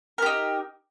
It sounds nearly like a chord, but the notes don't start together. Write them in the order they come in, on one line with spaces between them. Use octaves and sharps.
A#4 G4 D#4